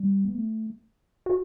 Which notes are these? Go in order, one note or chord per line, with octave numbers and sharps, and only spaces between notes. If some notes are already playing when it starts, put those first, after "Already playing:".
Already playing: G3
B3
A3
F#4